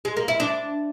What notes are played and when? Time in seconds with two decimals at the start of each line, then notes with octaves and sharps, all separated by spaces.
0.05 G#3
0.17 A#3
0.28 E4
0.40 D4